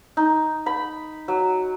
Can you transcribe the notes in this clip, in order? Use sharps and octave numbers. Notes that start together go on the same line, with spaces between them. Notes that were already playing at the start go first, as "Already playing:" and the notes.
D#4
B5
F#3